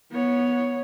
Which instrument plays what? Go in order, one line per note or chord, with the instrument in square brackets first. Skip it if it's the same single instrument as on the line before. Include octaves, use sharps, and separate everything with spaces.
[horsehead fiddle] B3 C#5